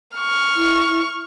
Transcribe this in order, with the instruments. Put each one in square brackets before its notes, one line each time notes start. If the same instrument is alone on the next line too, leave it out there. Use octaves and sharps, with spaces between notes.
[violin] C#6 F6
[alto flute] E4